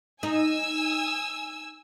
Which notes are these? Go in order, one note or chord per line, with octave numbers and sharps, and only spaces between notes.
D#4 G#5 E6